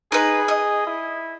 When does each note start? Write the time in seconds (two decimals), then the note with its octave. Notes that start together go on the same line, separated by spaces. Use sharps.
0.12 D#4 G#4 B4
0.48 D#5
0.87 E4